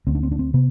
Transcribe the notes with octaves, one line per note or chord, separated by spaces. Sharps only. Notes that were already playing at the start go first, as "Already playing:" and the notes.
D2 C4
D4
C4
D4
C4
C3 B3